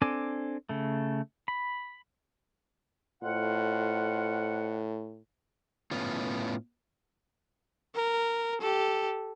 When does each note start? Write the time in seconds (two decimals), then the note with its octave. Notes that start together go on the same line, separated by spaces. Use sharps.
0.02 C4 D4 A4 G#5 D6
0.69 C#3 A3
1.48 B5
3.23 F2 A2 F4 F#5
5.91 A2 B3 C#4 F4
7.95 A#4
8.61 G4 A4